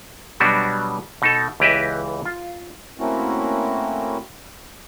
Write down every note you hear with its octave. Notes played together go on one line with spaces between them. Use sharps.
B2 F#3 G3 B3 D4 F#4
B2 D#4 A4
C#2 E3 G4 B4 D#5 E5
F4
A3 A#3 C4 C#4 E4 F#4